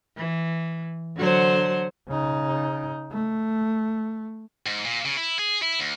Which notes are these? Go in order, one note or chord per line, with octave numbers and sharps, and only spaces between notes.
E3
D3 F#3 C5
C#3 D#4
A3
G#2
A#2
C#3
E4
G#4
E4
D2